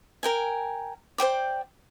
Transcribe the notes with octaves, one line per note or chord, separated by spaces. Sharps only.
A#4 G5 G#5
C5 D5 G5 D6